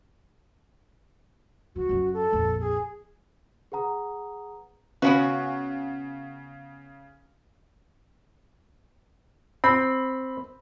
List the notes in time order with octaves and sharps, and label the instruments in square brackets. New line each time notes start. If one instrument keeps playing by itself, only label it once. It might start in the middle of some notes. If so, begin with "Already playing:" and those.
[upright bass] F3 [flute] F#4
[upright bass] F#2 F#3
[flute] A4
[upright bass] A#1 F2
[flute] G#4
[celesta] G#4 B4 F#5 A#5 D#6
[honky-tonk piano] C#3 [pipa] B3 C#4 F#4 [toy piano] B4 F5 G#5
[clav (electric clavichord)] C4 [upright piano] B5